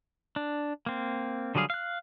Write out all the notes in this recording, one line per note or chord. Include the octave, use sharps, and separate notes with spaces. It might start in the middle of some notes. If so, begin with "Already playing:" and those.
D4
A#3 C4
D3 F#3 G3 G#4 F5
F5 F#6